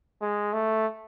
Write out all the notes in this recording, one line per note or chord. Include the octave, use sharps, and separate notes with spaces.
G#3
A3